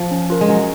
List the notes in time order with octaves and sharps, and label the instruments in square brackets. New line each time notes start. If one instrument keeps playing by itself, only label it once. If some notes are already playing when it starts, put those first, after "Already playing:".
Already playing: [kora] F3
[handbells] C#4
F4 A#4
[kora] G#3
[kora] F#3 [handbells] C#4